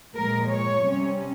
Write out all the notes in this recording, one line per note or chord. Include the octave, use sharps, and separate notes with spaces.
A#2 F3 G#3 A#4
C#5
C3 G3 C#4